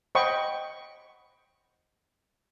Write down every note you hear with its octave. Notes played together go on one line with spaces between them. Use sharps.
C5 D#5 F#5 G5 B5 C#6